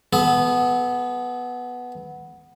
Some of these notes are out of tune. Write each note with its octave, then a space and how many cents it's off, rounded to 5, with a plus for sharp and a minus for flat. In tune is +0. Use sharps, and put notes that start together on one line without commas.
B3 +0 A4 -40